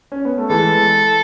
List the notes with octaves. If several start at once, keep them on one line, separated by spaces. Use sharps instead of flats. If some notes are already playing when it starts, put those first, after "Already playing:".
C#4
B3
A3
E3 G#3 A4